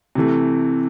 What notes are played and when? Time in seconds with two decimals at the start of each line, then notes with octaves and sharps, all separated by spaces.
0.15 C3 E3 A3